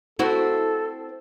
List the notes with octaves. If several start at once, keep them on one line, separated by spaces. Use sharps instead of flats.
C4 E4 F#4 A4